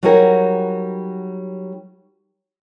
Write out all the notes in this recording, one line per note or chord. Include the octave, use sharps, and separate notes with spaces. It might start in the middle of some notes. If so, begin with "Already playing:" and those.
F#3 G3 D#4 F#4 G#4 A#4